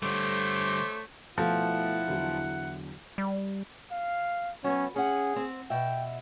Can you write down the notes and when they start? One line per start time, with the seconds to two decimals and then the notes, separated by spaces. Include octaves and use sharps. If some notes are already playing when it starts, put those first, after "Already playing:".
0.03 D3 G3 A3 C5 C#5 D6
1.38 B2 F3 A3 E4 A4 F#5
2.07 E2 D3 F#3
3.18 G3
3.91 F5
4.64 F#3 B3 C#4
4.96 C#4 G#4 F#5
5.36 C4
5.70 B2 E5 G5